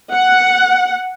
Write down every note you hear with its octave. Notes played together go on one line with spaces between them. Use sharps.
F#5